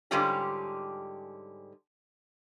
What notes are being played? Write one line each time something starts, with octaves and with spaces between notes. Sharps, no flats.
G#2 D3 G3 C#4 F4 G4